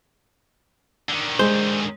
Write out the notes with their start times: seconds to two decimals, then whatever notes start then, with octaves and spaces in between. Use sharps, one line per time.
1.09 D3 D#3
1.39 G#3 C5